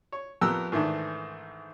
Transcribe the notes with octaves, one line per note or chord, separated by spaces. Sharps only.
C#5
F2 B3 G4 A#4 E6 F#6
G#2 D#3 E3 A3 D4